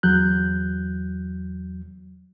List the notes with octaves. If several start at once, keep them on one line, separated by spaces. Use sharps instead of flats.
E2 F#3 F#6 G6